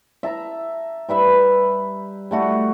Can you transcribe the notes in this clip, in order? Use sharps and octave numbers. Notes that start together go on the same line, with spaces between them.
E5 A5 A#5
G3 B4 E5 B5
G3 A3 F#4